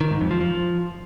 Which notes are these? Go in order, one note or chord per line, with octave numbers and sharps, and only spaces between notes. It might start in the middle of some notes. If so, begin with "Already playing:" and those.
D#3
G#2
F2
F3
F3